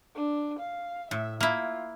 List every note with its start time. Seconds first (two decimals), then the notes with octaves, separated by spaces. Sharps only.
0.15 D4
0.60 F5
1.11 A2 E5
1.41 A#3 E4 F4